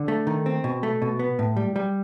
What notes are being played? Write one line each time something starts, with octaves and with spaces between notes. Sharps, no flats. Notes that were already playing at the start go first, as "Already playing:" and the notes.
Already playing: D3
A3
D#3
C4
B2
A3
B2
B3
A2
G3
G3